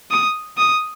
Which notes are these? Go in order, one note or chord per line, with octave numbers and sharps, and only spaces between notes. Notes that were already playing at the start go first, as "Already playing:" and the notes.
D#6
D#6